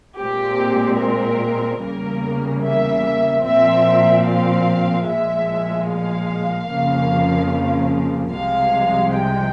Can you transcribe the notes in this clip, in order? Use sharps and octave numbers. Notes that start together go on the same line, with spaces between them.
A#2 G#3 C4 G4
A#4
E2 C#3 G3 A#3 A#4
E5
A#2 F3 C4 E5
F5
A#2 F3 G#3 E5
F5
F2 C#3 F3 A#3
C2 C3 F3 G#3 F5
G5